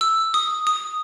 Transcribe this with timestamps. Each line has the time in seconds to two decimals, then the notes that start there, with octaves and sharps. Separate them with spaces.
0.01 E6
0.34 D#6
0.67 D#6